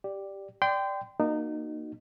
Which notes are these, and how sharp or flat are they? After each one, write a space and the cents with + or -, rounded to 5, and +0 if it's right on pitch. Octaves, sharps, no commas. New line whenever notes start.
G4 +0 D5 +0
D5 +0 G5 +0 C6 -35
A#3 +0 D#4 -25 F#4 +0